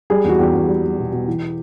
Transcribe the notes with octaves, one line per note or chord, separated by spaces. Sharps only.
G3 G#4
E2 F#4
E2 G4
E2
G3
G3
B2
B2
E3